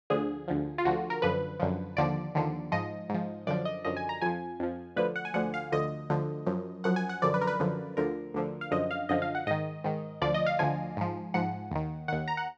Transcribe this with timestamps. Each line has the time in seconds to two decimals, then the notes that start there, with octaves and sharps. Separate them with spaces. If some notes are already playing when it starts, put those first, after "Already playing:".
0.10 D2 D3 F3 G#4
0.48 D2 D3 F3
0.78 F4
0.85 D2 D3 F3 F#4
1.10 A#4
1.22 F#2 D3 F3 B4
1.60 F#2 D3 F3
1.97 D#2 D3 F3 D5
2.35 D#2 D3 F3
2.72 G#2 F3 D#5
3.10 G#2 F3
3.47 F#2 D3 F3 D5
3.65 D#5
3.85 F#2 D3 F3 D#5
3.97 G#5
4.09 A#5
4.21 F2 F3 G#5
4.60 F2 F3
4.96 D2 D3 F3 B4
5.16 F#5
5.25 G#5
5.34 D2 D3 F3 F#5
5.54 F5
5.72 D2 D3 F3 D#5
6.10 D2 D3 F3
6.46 F#2 F3
6.84 F#2 F3 F#5
6.96 G#5
7.09 F#5
7.22 F#2 D3 F3 D5
7.34 B4
7.41 A#4
7.47 B4
7.60 F#2 D3 F3
7.97 D2 D3 F3 A#4
8.34 D2 D3 F3
8.61 F5
8.71 F#2 D3 F3 D#5
8.91 F5
9.09 F#2 D3 F3 D#5
9.22 F5
9.35 F#5
9.47 G#2 D#3 D#5
9.84 G#2 D#3
10.21 D2 D3 F3 D5
10.34 D#5
10.46 F5
10.59 D2 D3 F3 G#5
10.97 G#2 F3
11.34 G#2 F3 F#5
11.71 D#2 D#3
12.08 D#2 D#3 F#5
12.28 A#5
12.37 F#5